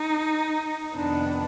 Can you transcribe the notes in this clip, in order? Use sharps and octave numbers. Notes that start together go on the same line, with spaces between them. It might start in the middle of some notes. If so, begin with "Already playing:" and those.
Already playing: D#4
F2 C3 D#3 B3 D4